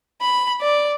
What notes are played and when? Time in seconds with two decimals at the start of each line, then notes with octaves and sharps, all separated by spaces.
0.21 B5
0.61 D5